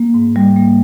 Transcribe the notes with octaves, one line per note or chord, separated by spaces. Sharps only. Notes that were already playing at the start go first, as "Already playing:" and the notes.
Already playing: A#3
G#2
G3
A#3